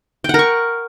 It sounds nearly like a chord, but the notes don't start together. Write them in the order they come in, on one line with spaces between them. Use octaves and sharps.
G5 F#5 A#4 C#6